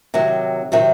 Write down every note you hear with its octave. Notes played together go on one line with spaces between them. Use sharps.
C3 D#3 F#3
C3 D#3 F#3